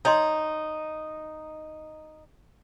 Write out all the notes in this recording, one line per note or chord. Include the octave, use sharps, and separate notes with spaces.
D#4 C#5 D#5 C6